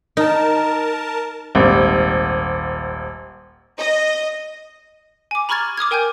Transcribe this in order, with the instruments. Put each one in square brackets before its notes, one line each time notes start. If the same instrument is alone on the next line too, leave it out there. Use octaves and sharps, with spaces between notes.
[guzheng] D#4 [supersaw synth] A#4 A5
[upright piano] D#1 G#1
[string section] D#5
[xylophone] G#5 D6
A#5 B5 C#6 F6 G#6 A6
D6 D#6 F6 G#6
A#4 G5 G#5 F6 G6